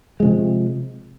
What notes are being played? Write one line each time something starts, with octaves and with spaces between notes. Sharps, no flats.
C3 F3 G#3